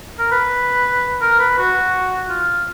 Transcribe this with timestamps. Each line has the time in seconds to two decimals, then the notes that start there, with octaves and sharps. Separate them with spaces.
0.19 A#4
0.31 B4
1.21 A#4
1.39 B4
1.58 F#4
2.30 F4